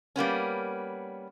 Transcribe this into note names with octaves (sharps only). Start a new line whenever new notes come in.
G3 A#3 B3 C#4